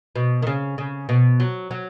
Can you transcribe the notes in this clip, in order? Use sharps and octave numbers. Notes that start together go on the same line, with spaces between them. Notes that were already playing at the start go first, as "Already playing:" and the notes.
B2
D#3
C#3
C#3
B2
F#3
F#3